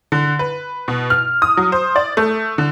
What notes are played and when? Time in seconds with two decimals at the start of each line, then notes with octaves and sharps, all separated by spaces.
0.12 D3
0.39 B4
0.88 B2
1.10 F6
1.42 D#6
1.57 F#3
1.72 C5
1.96 D5
2.17 A3
2.58 D3